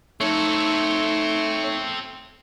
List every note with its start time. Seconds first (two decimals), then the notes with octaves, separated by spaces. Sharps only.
0.21 A3 C4 D#4 A4 C#5